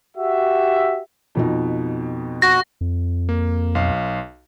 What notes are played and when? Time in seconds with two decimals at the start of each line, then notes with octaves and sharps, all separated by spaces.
0.17 F#4 G4 E5
1.35 F2 B2 D#4
2.42 F#4 A#6
2.81 F2
3.29 A#3
3.75 B1 F5